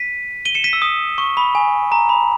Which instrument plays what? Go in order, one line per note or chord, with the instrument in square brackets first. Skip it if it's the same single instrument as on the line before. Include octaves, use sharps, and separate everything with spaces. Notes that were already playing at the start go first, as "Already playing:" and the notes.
Already playing: [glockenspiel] B6 D#7
D#7 G7
C#7 E7
B6 D#7
E6
D#6
C#6
B5
G#5
A#5
B5